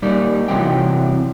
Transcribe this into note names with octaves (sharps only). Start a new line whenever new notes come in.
G3 A#3 D#4 D5
C3 E3 F#3 C4 G5